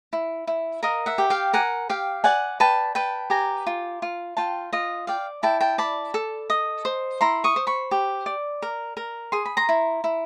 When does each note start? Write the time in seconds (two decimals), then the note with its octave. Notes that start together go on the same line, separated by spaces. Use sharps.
0.13 E4
0.47 E4
0.83 A#4 D#5 F5
1.06 E5 F#5
1.18 G4
1.30 F5 G5
1.53 A#4 F#5 G#5
1.89 G4 F5 G5
2.24 D5 F#5 G#5
2.60 B4 G5 A5
2.95 B4 G5 A5
3.30 G4 G#5 A#5
3.67 F4
4.02 F4
4.37 F4 G5 A5
4.73 F4 D#5
5.07 D5 F5 G5
5.43 E4 G5 A5
5.61 G5 A5
5.78 D5 A5 B5
6.14 A4
6.50 D#5
6.85 C5
7.21 E4 A#5 C6
7.44 C#6 D#6
7.56 C5
7.67 B5 C#6
7.91 G4
8.26 D5
8.62 A#4
8.97 A#4
9.32 G#4 C6
9.45 B5
9.57 A#5 C6
9.69 E4
10.04 E4